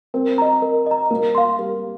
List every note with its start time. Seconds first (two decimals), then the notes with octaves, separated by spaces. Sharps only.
0.14 C4 A#4
0.38 D#5 A#5
0.62 A#4
0.86 D#5 A#5
1.11 A#3 A#4
1.35 F5 C6
1.59 G3 A#4